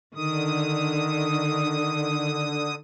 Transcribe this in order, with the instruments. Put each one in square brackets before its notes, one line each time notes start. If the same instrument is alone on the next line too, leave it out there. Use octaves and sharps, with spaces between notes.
[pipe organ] D3 D#6 [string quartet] D#3